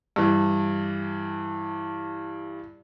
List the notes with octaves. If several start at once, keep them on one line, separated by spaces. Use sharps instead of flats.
G2 E3